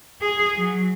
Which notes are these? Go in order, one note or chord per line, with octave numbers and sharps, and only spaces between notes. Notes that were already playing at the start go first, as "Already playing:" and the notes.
G#4
F#3